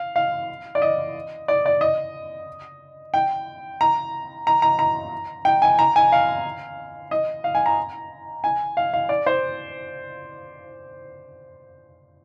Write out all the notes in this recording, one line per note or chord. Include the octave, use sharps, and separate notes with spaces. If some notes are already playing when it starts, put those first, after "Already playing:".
Already playing: F5
F5
D5
D#5
D5
D5
D#5
G5
A#5
A#5
A#5
A#5
G5
G#5
A#5
G#5
F5
D#5
F5
G#5
A#5
G#5
F5
F5
D5
C5